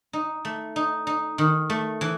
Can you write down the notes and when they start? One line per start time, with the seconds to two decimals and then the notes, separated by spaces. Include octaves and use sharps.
0.13 D#4
0.45 A3
0.76 D#4
1.07 D#4
1.38 D#3
1.70 A3
2.01 E3